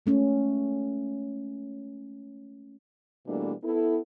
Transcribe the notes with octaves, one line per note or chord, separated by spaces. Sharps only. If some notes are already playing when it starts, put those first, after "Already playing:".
G#3 A3 C#4
B2 E3 G3 A3 A#3 D4
B3 E4 A4